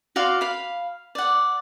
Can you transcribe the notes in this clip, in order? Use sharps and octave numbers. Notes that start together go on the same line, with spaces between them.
F#4 D5 F5 C6
F5 B5
D5 F#5